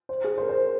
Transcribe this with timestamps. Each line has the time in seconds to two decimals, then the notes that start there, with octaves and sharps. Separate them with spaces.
0.09 C5
0.24 G#4
0.38 C5
0.41 A#4
0.49 C5